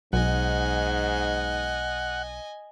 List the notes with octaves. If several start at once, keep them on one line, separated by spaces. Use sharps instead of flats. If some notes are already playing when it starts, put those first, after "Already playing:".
B1 G#2 D#5 F#5 G#5